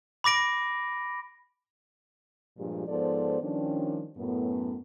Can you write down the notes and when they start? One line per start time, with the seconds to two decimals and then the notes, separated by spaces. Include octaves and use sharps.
0.24 B5 D6 A#6 D7
2.58 G2 A#2 F3 G#3 G4
2.88 G#2 F3 B3 A4 C5 D5
3.41 D#3 F3 G3 C#4 D4
4.17 F#2 A2 B3